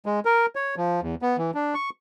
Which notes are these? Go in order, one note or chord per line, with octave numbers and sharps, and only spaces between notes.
G#3
A#4
C#5
F3
E2
B3
E3
D4
C#6